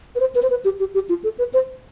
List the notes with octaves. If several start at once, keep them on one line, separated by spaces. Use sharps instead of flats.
B4
C5
B4
C5
B4
G4
G4
G4
F4
A4
B4
C5